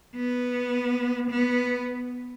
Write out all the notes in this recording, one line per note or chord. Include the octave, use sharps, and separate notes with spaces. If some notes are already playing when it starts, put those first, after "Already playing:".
B3
B3